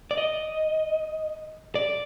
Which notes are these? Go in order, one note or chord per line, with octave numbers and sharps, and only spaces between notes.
D5
D#5
D5